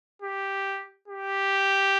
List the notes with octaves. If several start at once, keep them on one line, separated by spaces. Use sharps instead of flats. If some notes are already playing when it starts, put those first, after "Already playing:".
G4
G4